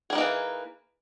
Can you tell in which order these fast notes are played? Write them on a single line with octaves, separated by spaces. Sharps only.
G#4 G3 D#4 A#3 E3